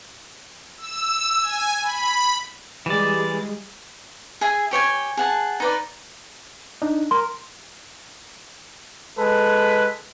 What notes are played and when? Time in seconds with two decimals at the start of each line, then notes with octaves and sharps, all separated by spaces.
0.77 E6
1.41 G#5
1.82 B5
2.86 E3 G3 G#3 G#4 D5
4.41 G#4 E5 G#5
4.71 G4 C#5 G5 G#5
5.17 G#4 F#5 A5
5.60 D#4 B4 D5
6.82 D4 D#4
7.11 A#4 C6
9.18 G#3 A4 B4